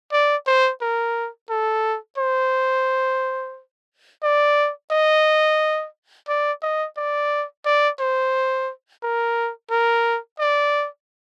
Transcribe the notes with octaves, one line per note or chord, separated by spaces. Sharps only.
D5
C5
A#4
A4
C5
D5
D#5
D5
D#5
D5
D5
C5
A#4
A#4
D5